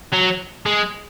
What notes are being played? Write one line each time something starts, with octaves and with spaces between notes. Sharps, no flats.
F#3
G#3